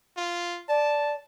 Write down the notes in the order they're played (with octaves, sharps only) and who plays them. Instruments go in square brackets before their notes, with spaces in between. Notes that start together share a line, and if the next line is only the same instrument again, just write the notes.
[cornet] F4
[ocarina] D5 [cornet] A5